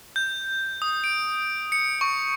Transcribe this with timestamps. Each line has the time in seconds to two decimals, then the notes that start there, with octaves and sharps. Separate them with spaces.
0.16 G6
0.82 D#6
1.04 D7
1.72 C#7
2.01 C#6